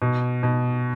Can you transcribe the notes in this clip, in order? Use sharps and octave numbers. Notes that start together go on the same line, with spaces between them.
B2
B2